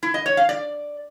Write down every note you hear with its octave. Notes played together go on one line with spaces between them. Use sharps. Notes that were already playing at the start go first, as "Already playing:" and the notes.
E4
D#5
C#5
F5
D5